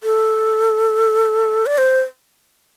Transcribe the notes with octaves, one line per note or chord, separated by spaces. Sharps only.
A4
D5
C5